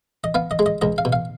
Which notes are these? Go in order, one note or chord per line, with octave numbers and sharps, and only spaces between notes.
D#5
B3 F5
D#5
G#3
D#5
C#2 D#5
F5
B2
F5